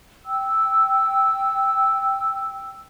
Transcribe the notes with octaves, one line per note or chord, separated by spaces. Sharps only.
G5 E6